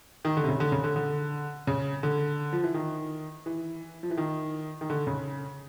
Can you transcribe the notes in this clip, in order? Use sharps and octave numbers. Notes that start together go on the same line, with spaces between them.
D#3
D3
C3
C#3
D3
C#3
D3
D3
C#3
D3
F3
E3
D#3
E3
F3
E3
D#3
D#3
D3
C#3